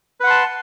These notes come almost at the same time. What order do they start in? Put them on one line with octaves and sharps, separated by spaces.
B4 F#5 C6 A5